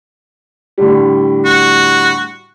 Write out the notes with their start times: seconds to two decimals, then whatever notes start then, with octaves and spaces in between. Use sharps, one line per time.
0.78 A2 D3 G3
1.45 F#4